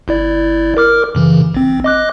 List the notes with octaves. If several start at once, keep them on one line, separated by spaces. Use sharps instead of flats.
G1 E4 D5
A#4 D6 F6
F#2 C#3 E3
A1 C4
D#5 D6 F#6